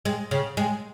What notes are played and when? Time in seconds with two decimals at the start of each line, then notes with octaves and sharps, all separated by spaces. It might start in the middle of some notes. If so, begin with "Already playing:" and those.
0.05 G#3
0.31 C#3
0.57 G#3